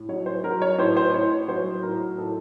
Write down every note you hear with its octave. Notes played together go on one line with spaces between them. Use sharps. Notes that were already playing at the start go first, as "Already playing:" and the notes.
Already playing: A2
F#3 C#5
C5
F#3 A#4
C#5
A2 C5
C5
A2 C#5
F#3 C5
A2 A#4
A2 A4